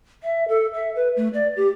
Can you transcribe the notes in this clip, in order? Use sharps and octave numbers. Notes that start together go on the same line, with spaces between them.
E5
A4
E5
B4
A3
D5
G4